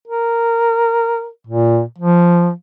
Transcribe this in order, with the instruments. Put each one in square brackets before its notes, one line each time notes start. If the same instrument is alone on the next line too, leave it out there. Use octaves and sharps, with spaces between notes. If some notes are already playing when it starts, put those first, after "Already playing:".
[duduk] A#4
A#2
F3